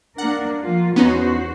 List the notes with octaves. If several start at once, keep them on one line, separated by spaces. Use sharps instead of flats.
A#3 D4 A#4 F#5
F3 A#3 F4
E2 B3 C#4 D#4 F#4 C5